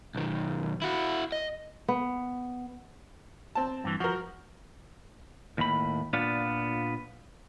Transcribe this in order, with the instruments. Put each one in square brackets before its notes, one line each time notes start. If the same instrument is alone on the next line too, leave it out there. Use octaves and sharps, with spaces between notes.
[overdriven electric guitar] B1 D#3
E4 F#4
D#5
[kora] B3
[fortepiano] C4 A5
[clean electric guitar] G2 E3
[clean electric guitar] F3 [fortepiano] F#4 A#4
[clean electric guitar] D#2 A2 B5
A#2 B3 D4 F4